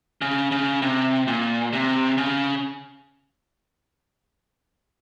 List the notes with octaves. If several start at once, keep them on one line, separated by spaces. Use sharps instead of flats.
C#3
C#3
C3
A#2
C3
C#3